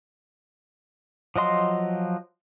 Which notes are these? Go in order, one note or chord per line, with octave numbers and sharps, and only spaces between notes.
F3 F#3 D#5 C6